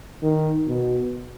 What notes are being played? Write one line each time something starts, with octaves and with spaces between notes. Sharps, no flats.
D#3
B2